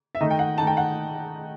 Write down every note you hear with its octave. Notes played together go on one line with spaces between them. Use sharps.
E5
D#3 A3 D#4 D#5
G5
F#5
D#3 A3 D#4 A5
G5
F#5